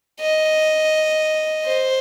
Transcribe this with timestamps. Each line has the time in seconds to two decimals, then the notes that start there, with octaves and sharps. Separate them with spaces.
0.21 D#5
1.66 C5